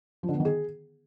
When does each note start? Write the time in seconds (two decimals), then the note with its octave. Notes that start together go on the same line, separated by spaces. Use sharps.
0.23 F3
0.29 D3
0.34 B3
0.40 D#3
0.45 G#4